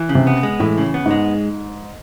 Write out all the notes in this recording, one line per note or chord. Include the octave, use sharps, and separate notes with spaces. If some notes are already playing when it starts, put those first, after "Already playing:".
Already playing: E3
C#3
C3
B3
G#3
A2 E3
C#3
B3
G#2
G#3